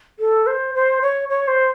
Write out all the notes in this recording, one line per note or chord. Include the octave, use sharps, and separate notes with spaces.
A4
C5
C5
C#5
C#5
C5